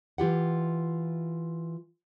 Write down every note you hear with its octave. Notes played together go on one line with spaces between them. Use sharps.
E3 F4 G4 F#5